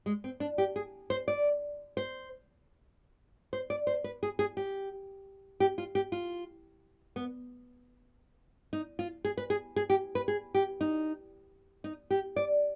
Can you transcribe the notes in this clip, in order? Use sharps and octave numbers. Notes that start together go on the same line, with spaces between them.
G#3
C4
D4
G4
G#4
C5
D5
C5
C5
D5
C5
B4
G#4
G#4
G4
G4
F4
G4
F4
B3
D#4
F4
G#4
B4
G#4
G#4
G4
B4
G#4
G4
D#4
D#4
G4
D5